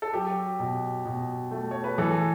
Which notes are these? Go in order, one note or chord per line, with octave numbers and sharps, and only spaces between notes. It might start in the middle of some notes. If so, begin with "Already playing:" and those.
A4
F#3 G4
B2
B2
A3
C#5
B4
E3 A4